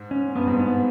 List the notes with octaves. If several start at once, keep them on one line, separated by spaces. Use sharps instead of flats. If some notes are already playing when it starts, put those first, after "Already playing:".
Already playing: G#2
C#4
G2 B3
G#2
B3